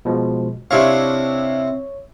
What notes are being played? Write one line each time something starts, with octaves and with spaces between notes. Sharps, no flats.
B2 F3 G#3
C3 C4 D4 E4 C#5 F5 C#6